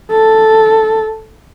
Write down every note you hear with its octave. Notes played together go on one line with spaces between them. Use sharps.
A4